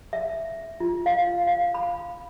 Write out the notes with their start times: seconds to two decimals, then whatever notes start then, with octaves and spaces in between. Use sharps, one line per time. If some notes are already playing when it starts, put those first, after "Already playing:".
0.13 E5
0.80 F4
1.06 F5
1.47 F5
1.74 B5